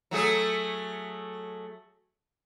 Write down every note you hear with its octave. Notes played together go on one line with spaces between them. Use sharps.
F#3 A3 G#4